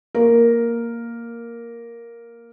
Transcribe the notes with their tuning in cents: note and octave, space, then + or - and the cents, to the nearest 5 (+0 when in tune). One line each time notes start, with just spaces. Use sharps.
A#3 +0 A#4 +0